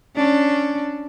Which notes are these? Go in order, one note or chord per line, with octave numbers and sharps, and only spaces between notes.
C#4 D4